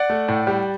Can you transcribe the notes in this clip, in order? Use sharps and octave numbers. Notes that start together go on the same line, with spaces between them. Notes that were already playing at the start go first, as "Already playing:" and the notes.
Already playing: D5 F#5
A3
A2
G3